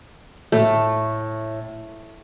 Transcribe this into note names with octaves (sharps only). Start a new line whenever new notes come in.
A2 A3